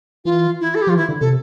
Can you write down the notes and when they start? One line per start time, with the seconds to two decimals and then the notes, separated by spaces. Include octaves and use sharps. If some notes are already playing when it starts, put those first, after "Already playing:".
0.25 E3 F4
0.61 E4
0.75 A4
0.82 G4
0.87 F3 F4
0.97 E3 E4
1.09 D3
1.21 C3 A4